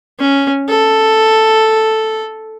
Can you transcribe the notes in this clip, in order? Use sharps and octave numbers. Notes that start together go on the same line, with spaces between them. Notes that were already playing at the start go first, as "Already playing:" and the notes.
C#4
A4